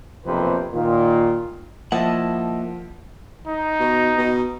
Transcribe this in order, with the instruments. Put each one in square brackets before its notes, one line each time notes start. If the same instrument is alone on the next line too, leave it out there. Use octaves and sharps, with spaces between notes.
[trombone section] B1 F2 C3 A#3 B4 C5
A#2 D#3 F4
[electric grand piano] F3 [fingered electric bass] A#3 [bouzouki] E4 D#5 A5 [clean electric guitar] F#5
[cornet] D#4
[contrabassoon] B2
B2